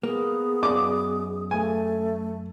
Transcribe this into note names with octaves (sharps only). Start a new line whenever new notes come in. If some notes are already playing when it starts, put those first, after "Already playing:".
A#3 B3 G#4
F#2 D5 D#5 D6
A3 G#5